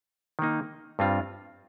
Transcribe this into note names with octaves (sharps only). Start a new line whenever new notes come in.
D#3 A#3 D#4
G2 G3 C4 F4